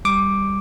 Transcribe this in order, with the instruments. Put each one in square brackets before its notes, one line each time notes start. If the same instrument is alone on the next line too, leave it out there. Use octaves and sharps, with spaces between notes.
[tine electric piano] G3 D6